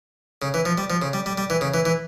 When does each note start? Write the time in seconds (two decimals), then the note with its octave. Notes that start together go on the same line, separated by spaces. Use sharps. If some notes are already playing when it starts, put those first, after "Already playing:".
0.42 C#3
0.54 E3
0.65 F3
0.78 G3
0.90 F3
1.02 C#3
1.13 G3
1.26 G3
1.38 G3
1.50 E3
1.61 C#3
1.74 E3
1.85 E3